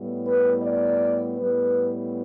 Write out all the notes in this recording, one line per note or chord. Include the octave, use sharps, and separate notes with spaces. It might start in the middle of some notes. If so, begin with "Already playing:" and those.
Already playing: A2 G3 B3
B4
D5
A2 G3 B3 B4